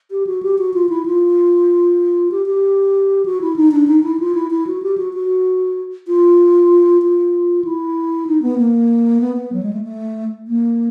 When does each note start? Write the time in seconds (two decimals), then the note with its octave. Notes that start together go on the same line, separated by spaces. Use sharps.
0.11 G4
0.27 F#4
0.43 G4
0.58 F#4
0.74 F4
0.89 E4
1.06 F4
2.31 G4
2.46 G4
3.26 F#4
3.41 E4
3.56 D#4
3.72 D4
3.87 D#4
4.03 E4
4.20 F4
4.35 E4
4.51 E4
4.67 F#4
4.83 G4
4.98 F#4
5.13 F#4
6.07 F4
7.02 F4
7.65 E4
8.27 D#4
8.42 B3
8.58 A#3
9.21 B3
9.37 B3
9.53 F#3
9.63 G#3
9.73 A3
9.84 A3
10.47 A#3